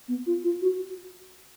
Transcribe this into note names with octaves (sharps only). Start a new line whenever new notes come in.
B3
F4
F4
F#4